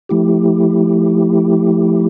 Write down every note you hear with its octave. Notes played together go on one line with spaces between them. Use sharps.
F3 A3 E4 G4